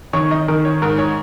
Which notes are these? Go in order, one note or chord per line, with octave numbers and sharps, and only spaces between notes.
D#3 C#5 C#6
D#4 D#5
D#3 A#4
C#5
G#2 A#4
C#5